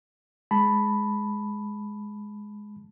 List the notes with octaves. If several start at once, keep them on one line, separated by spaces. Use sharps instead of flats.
G#3 A5 B5